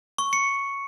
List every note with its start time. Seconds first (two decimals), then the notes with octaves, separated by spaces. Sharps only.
0.18 C#6
0.33 C#7